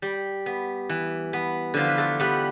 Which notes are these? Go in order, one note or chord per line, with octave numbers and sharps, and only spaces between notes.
G3
B3
E3
B3
D3 F3 F4
B4
A3 A4
G3 B3 B4